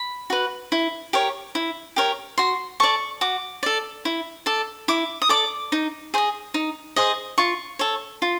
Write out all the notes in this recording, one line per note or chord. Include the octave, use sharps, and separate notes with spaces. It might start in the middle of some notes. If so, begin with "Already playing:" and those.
Already playing: B5
F#4 B4
E4
G4 A#4 C#5
E4
G4 A#4 C#5
F#4 C6
A4 D5 C#6
F#4 D6
A4 D5
E4
A4 D5
E4 D6
D#6
A4 D5 D6
D#4
G#4 C5 D#5
D#4
G#4 C5 D#5
F4 C#6
A4 C#5
F4